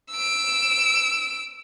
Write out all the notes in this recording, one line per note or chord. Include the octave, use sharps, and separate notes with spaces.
E6 D7